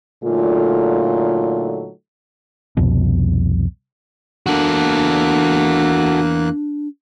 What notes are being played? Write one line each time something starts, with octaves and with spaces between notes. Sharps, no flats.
A#2 D3 F#3 A3 D#4 F4
C2 F2 B2
E2 A#3 D4 F#4 A4 F#5 F#6